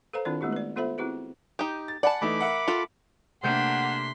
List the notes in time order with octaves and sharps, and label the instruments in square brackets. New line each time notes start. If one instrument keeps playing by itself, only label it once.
[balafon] A4 B4 C5 F5 A#5
D#3 C4 D4 E4 F4 D5
G#3 A3 B3 E4 G4
B4 D5
B3 F4 A4 C5 E5 B5
C4 E4 F#4 G#4 B4
[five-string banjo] D#4 G4 [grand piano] D#6
[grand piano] A6
[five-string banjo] D5 A5 [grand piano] F#5 G#5 B5
[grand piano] E3 A3 D#4 [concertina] B5 D6
[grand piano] A#4 E5 F#5
[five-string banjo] F4 A4
[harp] C3 A3 G6 [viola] A#3 D4 [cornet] F#5 [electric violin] C6 B6